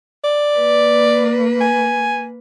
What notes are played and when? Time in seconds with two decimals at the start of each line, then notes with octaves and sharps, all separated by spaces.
0.24 D5
0.57 A#3 B4
1.61 G#5